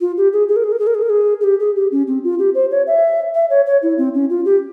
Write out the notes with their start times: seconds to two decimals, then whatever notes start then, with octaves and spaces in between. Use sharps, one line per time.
0.01 F4
0.17 G4
0.33 G#4
0.48 G#4
0.56 A#4
0.64 G#4
0.72 A#4
0.79 G#4
0.87 A#4
0.95 G#4
1.02 A#4
1.10 G#4
1.41 G#4
1.44 G4
1.60 G#4
1.76 G4
1.92 C#4
2.07 C4
2.24 F4
2.39 G4
2.55 C5
2.71 C#5
2.87 E5
3.34 E5
3.50 C#5
3.66 C#5
3.82 E4
3.98 C4
4.14 C#4
4.30 F4
4.45 G4